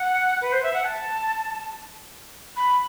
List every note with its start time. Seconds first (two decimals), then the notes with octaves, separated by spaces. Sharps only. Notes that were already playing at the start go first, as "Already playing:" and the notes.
Already playing: F#5
0.41 B4
0.52 C5
0.63 E5
0.73 F#5
0.84 A5
2.56 B5